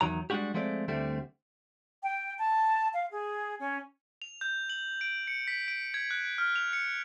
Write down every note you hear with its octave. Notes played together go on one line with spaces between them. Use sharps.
E2 D#3 F#3 A#5
G3 G#3 C4 D4 F#4 G4
F3 G#3 A3 C4 D5
D2 D3 G3 A3 C4
G5
A5
F5
G#4
C#4
F7
G6
F#7
D7
C#7
B6
D7
G#6
F#6
F6
F7
C#7